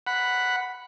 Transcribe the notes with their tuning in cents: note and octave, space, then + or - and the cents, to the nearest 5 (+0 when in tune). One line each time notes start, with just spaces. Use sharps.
F#5 +0 B5 +0